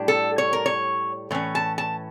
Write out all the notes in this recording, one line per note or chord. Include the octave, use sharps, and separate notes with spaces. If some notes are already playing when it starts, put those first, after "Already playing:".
Already playing: A2 G3 D4
A4
C#5
A#4
C#5
A2 E3 C#4
A5
A5